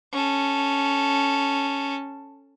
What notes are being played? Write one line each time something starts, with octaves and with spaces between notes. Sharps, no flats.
C#4 A4